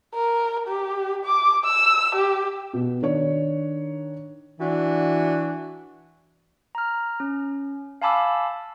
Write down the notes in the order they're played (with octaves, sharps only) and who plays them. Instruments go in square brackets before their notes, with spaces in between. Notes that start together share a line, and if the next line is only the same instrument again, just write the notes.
[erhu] A#4
G4
D6
E6
G4
[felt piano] B2
D#3 D4 C#5
[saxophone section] E3 D4 F#4
[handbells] A#5 F6
C#4
F5 G#5 A5 B5 D6 E6